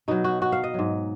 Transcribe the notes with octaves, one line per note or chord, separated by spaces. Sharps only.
B2 F#3 D#4
F#4
F#4
F5
D#5
G#2 F#3